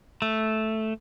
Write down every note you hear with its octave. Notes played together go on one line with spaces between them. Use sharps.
A3